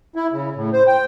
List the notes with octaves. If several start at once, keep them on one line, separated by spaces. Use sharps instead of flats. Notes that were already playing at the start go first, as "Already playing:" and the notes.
E4
C#3
A2
C5
G5